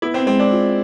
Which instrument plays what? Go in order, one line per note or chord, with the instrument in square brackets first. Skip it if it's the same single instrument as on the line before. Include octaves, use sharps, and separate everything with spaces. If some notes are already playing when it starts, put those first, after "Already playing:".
[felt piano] B3 [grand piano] E4
[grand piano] C4
[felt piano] G#3 [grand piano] C4
[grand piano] D4
[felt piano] F4